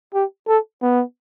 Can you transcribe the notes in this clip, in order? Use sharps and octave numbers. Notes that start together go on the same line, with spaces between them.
G4
A4
B3